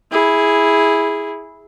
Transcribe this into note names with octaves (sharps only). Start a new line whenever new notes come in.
E4 G#4